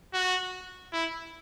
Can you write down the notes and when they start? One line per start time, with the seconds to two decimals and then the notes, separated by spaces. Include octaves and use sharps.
0.14 F#4
0.93 E4